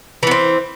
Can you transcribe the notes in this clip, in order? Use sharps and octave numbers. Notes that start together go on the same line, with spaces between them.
E3 B3 C4